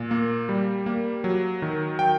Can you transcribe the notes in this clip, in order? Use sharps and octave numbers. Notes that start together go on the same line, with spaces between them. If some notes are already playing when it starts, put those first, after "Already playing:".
Already playing: A#2
A#3
G3
A#3
F#3
D#3
F#3 G5